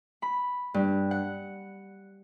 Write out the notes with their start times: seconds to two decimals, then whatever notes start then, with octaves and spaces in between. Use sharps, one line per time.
0.22 B5
0.74 G2
1.11 F#5